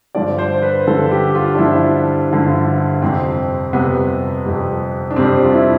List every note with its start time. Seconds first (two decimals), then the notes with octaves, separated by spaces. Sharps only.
0.15 G2 D3 F3 D5
0.38 C5
0.62 B4
0.87 G2 D3 F3 A4
1.11 G4
1.30 G4
1.35 F4
1.55 D4
1.58 G2 D3 F3 E4
2.31 G2 D3 F3
3.02 F2 C3 G3 C4
3.73 F2 C3 G3 B3
4.45 F2 C3 G3
5.11 D4
5.16 F2 C3 G3 C4
5.44 F4
5.53 E4